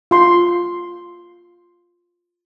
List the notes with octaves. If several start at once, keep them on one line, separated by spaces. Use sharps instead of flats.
F4 C6